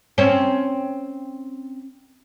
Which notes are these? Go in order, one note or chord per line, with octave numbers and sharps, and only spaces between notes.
C4 C#4